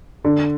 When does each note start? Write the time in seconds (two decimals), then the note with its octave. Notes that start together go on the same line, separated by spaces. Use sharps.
0.25 D3